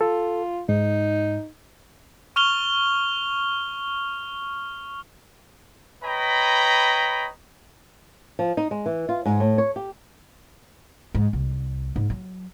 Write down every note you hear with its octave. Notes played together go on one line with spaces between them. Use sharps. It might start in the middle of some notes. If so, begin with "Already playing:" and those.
F4 A4
G#2 D#4
C#6 F6 F7 G7
B4 C#5 D#5 G5 A#5 B5
F3
D#4
G#3
E3
F4
G#2
A2
C#5
G4
G#2
C2
G#2
F#3